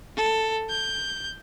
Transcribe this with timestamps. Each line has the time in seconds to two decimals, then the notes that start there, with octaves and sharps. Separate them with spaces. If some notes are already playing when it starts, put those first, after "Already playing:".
0.17 A4
0.70 G6